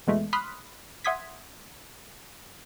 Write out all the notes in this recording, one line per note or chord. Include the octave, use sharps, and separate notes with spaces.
E2 B2 G#3 A3
B5 C6 D#6 F6 F#6 B6
E5 F#5 C6 D#6 G#6 B6